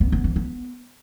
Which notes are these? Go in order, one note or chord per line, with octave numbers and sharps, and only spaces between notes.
B3
B3
E3
B3